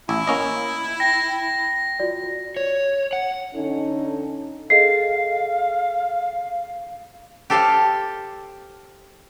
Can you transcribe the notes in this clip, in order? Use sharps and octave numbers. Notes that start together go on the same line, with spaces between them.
A1 E4 E6
A#3 C#4 D#5
G5 A#6
F4 F#4 D5
C#5
F#5
D3 C#4 D#4 A4
G#4 A4 D#5 F5 C7
G4 A4 C5 F5